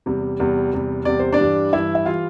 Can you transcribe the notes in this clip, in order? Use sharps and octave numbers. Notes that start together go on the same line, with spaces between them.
E2 C3 G3
E2 C3 G3
E2 C3 G3
E2 C3 G3 D5
C5
D4 D5
G2 E3 G3
G2 E3 G3 E4 E5
E5
E3 G3 F4 F5